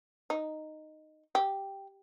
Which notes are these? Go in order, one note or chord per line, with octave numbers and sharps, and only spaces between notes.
D#4
G4